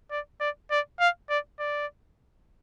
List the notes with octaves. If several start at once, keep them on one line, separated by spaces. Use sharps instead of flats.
D5
D5
D5
F5
D5
D5